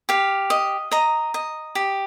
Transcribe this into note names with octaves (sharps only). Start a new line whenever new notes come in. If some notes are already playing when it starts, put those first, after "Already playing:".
G4 F5
D#5
D#5 A#5
D#5
G4